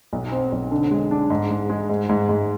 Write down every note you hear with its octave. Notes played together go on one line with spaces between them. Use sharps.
B1
C4
B1
D3
G#3
D4
G#2
G#2
G#3
G#2
G#2
G#2